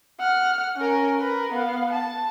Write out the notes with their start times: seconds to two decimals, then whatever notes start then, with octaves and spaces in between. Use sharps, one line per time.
0.20 F#5 F6
0.77 C#4 A#4
1.19 A#4 B4
1.53 B3 F5
1.93 A5